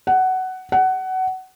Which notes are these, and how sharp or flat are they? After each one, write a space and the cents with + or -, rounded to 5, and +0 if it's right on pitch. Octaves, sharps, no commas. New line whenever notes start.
F#5 +15
F#5 +20